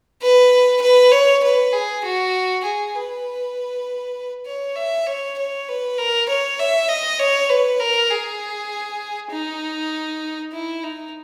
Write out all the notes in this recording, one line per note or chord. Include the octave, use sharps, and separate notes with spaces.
B4
B4
C#5
B4
G#4
F#4
G#4
B4
C#5
E5
C#5
C#5
B4
A#4
C#5
E5
D#5
C#5
B4
A#4
G#4
D#4
E4
D#4